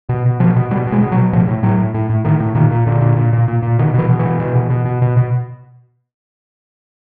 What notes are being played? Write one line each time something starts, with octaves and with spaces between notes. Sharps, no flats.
B2
B2
B2 F3
B2
B2 G3
B2
G#3
B2
F#3
B2
A2 F3
A2
A2 F#3
A2
A2
A2
A2 D#3
A2
A#2 D#3
A#2
A#2 D3
A#2
A#2
A#2
A#2
A#2
B2 D#3
B2 E3
B2
E3
B2
B2
B2
B2
B2
B2
B2